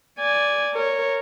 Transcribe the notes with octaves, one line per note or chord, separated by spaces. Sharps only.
D5 G#5
A#4 C#5